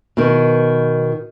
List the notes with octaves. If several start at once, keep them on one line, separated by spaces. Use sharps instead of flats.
B2 D#3